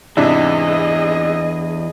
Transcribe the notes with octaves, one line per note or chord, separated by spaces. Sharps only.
E2 G#2 C3 D4 E4 G#4 D#5 E6